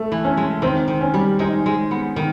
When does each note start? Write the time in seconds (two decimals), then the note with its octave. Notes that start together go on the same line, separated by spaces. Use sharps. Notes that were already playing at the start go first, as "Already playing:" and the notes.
Already playing: A3
0.12 E3
0.25 C#4
0.37 G#3
0.62 D#3 C4
0.88 D#3
1.01 C#4
1.14 G3
1.39 G#3 D#4
1.66 G#3
1.91 B3
2.16 D#3